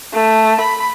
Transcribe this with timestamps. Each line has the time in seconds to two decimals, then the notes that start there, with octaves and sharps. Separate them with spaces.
0.13 A3
0.60 B5